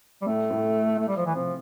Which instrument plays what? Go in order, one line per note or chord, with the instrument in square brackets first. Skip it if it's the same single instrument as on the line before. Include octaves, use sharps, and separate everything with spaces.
[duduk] G3
[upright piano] A2 [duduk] A3
[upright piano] A2
[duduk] A3
G3
F3
E3
[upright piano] C3 [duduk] F3